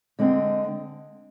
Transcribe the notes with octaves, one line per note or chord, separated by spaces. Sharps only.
D3 G#3 C4